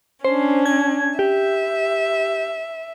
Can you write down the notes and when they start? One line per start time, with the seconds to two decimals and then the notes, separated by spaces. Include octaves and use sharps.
0.25 C#4 D4 C5
0.66 G#6
1.19 G4 E5